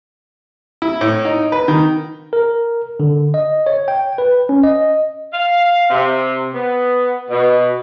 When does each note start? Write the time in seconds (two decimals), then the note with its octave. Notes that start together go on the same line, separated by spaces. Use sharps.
0.82 E4
1.01 A2
1.25 D#4
1.52 B4
1.68 D#3
2.33 A#4
3.00 D3
3.34 D#5
3.66 C#5
3.88 G5
4.18 B4
4.49 C#4
4.63 D#5
5.33 F5
5.90 C3
6.55 B3
7.29 B2